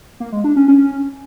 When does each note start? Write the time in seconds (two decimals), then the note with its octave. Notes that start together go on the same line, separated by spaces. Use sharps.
0.20 A#3
0.32 G#3
0.44 D4
0.56 C#4
0.68 C#4